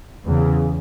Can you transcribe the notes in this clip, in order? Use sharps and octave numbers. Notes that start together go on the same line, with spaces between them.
E2 C#3